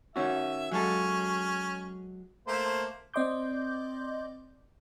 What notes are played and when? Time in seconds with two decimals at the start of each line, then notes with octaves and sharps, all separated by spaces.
0.16 D#3 C#4 F#4 E5
0.71 F#3 G#3 C#4 A4
2.47 A3 A#3 C5
3.14 C4 D5 D#5 C6 D6 G6